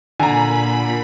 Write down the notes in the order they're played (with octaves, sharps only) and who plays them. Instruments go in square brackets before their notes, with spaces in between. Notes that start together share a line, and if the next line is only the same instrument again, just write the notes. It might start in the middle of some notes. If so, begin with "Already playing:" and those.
[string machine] A#2 B5 [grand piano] D3 [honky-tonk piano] G#5 A#5